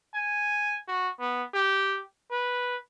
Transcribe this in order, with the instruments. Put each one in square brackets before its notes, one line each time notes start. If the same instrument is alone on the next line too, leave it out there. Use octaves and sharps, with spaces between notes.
[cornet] G#5
F#4
B3
G4
B4